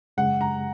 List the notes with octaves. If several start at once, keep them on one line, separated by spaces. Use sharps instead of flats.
F#2 C#3 G#3 F#5
A#5